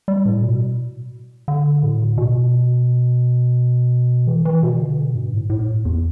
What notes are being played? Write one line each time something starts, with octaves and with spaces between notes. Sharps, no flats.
G3
A2
B2
D3
A2
B2
E3
E3
B2
D3
B2
G2
A2
A2
E2